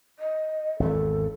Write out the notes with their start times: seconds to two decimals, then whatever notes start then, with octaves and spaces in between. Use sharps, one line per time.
0.19 D#5
0.80 G#1 E2 A4